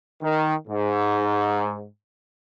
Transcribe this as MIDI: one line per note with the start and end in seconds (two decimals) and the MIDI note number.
0.22 0.54 51
0.68 1.86 44